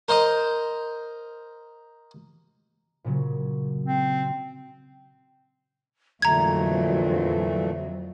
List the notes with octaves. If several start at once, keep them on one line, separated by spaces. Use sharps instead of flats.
A#4 C5 D#5
A#2 C#3 F#3
C4
F2 A#2 D3 E3 F#3 A3 A#5 G#6